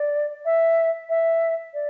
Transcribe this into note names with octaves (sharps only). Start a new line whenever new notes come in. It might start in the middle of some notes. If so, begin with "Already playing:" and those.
Already playing: D5
E5
E5
D5